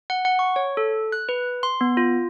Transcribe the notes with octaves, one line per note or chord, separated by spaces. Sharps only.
F#5
F#5
C#6
C#5
A4
F#6
B4
C6
B3
F4